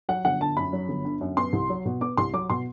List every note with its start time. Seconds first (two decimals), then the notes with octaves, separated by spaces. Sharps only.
0.09 F#3 F#5
0.25 G1 F#5
0.41 D3 A5
0.57 F#2 B5
0.73 F#3
0.89 G1
1.05 D3
1.21 F#2
1.37 B3 C6
1.53 C2
1.70 F#3
1.85 B2
2.01 B3 D6
2.17 C2 C6
2.33 F#3 D6
2.50 B2 C6